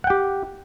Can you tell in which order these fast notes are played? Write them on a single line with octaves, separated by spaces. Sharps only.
F#5 G5 G4